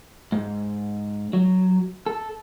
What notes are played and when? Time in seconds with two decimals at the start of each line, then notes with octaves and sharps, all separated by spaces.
0.32 G#2
1.33 F#3
2.06 A4